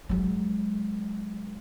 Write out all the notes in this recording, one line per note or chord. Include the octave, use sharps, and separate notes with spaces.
F#3 G#3